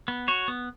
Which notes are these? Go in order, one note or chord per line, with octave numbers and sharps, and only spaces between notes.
B3
F#4 C#5
B3